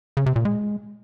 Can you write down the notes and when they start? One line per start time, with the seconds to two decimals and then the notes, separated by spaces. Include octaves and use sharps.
0.17 C#3
0.26 C3
0.36 A#2
0.45 G#3